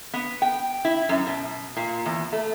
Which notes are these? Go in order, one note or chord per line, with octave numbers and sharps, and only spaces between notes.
B3
G5
E4
F#2
B2
A#2
E2
A3